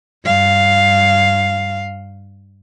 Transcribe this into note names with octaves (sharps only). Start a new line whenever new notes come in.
G2 F5